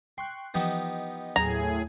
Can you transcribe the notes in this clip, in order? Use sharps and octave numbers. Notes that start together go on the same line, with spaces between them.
G5 C6 C#6 F#6
E3 F3 B3 D#4 G4 D#5
D#2 A2 F#3 G#4 A#5 G#6